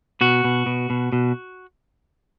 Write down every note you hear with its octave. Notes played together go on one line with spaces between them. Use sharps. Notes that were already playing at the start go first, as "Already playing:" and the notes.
B2 F#4
B2
B2
B2
B2